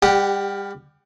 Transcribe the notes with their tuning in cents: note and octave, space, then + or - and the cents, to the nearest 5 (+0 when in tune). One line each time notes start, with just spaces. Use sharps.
G3 +30 G4 +0 F#5 +15